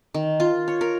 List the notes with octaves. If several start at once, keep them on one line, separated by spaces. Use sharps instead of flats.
D#3
F4
C#5
A#4